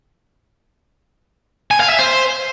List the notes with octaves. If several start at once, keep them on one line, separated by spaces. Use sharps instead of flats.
G#5
F5
E5
C5